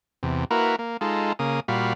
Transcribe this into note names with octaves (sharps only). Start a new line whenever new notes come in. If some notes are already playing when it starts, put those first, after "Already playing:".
E2 C3
A#3 E4 F#4 A#4 B4
A#3
G#3 D#4 F4 A4
C#3 A#3 D#6
A#2 G3 F#4 F5 B5